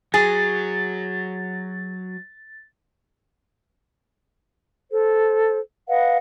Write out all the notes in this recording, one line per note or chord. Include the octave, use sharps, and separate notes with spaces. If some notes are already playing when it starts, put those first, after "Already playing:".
F#3 G#4 A6
A4 C5
B4 D#5 F5 F#5